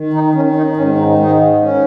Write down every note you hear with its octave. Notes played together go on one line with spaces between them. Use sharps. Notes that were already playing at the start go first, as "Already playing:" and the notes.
Already playing: D#3
D#4
D#3 C#4
D#4
G#2 C#4
D#4
G#2 D#4
G#2 C#4